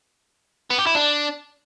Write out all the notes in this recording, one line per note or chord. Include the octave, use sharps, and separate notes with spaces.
B3
G4
E4
D4